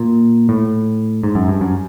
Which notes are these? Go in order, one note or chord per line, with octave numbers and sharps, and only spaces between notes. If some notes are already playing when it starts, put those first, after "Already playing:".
Already playing: A#2
A2
G#2
F#2
G2
F#2